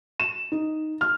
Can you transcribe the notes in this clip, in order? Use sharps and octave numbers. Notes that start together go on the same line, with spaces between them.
E7
D#4
F6